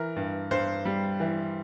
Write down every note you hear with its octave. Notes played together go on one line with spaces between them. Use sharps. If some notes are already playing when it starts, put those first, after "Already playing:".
Already playing: E3 A#4
G2
G2 C5
G3
E3